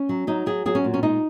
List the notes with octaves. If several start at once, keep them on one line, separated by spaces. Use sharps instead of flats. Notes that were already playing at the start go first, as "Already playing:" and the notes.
Already playing: C#4
F#3
F#3 D#4
F#3 G#4
F#3 G#4
C#4
A#2
C#4
G#3 D#4